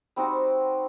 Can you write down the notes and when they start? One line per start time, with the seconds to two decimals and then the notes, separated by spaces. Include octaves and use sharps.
0.16 G3 C4 D#4 F#4